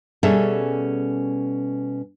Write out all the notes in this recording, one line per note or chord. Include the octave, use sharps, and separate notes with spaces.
B2 G3 C#4 G#4 A4 E5